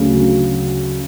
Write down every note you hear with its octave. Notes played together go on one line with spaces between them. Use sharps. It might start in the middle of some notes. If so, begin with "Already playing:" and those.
Already playing: D2 C#3 F#3